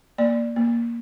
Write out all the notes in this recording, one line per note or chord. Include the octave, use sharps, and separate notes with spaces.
A#3 D5
A#3